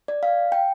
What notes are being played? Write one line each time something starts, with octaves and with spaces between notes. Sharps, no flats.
D5
F5
G5